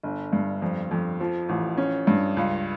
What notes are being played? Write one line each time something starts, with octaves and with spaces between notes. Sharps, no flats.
G1
G2
F2
F2
F3
A1
C#4
G2
C#2